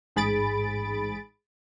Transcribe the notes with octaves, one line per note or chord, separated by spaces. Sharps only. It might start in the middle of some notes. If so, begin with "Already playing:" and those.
A1 G#2 G#4 B5 A6 D7